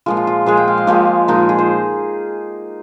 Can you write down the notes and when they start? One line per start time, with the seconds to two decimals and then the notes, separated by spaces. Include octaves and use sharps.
0.06 A#2 F3 G#3 F4
0.17 F4
0.27 F4
0.46 A#2 F3 G#3 G#4
0.57 G5
0.68 F5
0.78 D#5
0.87 A#2 F3 G#3 G4
1.28 A#2 F3 G#3 D#4
1.49 G#4
1.59 C5